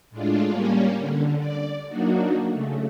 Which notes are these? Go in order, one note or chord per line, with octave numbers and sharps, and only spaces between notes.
A2 G#3 D4 F4
G3 A#3 C#4
D3
D5
F#3 A#3 D4 D#4 F#4
C#3 A3